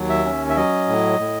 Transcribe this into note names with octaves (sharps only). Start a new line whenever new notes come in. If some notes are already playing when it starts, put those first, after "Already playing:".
Already playing: D#2 F#3
E5
C#4
E5
F#3 D#5
A2
A2